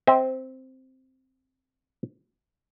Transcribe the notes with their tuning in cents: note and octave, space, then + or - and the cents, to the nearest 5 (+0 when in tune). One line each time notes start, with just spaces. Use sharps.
C4 +0 E5 -45